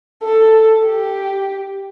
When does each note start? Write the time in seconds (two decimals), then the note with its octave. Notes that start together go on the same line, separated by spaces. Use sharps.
0.24 A4
0.86 G4